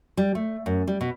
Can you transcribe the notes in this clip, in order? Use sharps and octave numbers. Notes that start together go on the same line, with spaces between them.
G3
A3
F#2
G3
B2